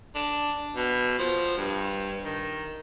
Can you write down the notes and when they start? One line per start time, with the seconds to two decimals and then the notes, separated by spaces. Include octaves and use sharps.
0.15 D4
0.76 B2
1.18 F3
1.57 G2
2.24 D#3